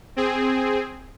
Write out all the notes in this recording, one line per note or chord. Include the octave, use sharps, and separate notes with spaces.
C4 G#4